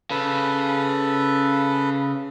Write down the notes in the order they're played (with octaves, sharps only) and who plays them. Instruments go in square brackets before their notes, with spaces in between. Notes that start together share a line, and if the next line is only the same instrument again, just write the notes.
[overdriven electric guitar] C#3 [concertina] A4 B4